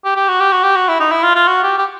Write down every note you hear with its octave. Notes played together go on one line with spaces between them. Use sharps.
G4
G4
F#4
G4
F#4
G4
F#4
E4
D#4
E4
F4
F4
F#4
G4
G4